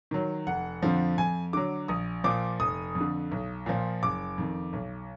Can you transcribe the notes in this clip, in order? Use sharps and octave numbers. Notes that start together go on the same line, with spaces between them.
D#3 F#3
F1 F#5
F2 D3 F3
F2 G#5
D3 F#3 D6
A#1 D#6
A#2 F3 D6
F1 D#6
F2
D3
B1
A#2 F3
F#1 D6
F2 D#3
B1